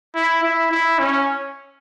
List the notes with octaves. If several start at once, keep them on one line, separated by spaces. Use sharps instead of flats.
E4
E4
E4
C#4